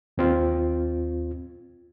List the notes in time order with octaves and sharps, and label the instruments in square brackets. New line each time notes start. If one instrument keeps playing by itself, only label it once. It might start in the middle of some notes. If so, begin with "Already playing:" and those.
[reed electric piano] D#2 C4 F4